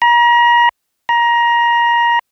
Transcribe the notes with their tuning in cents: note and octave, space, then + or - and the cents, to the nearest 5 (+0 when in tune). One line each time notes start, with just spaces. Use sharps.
A#5 +35
A#5 +20